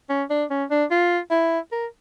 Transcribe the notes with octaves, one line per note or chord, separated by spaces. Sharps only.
C#4
D4
C#4
D4
F4
E4
A#4